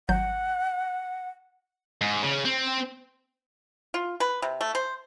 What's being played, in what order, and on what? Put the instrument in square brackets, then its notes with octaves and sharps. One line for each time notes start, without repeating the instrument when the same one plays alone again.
[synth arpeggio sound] G#1 F#3 G6 [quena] F#5
[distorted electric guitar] G#2
C#3
C4
[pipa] F4
B4
C3
A3
C5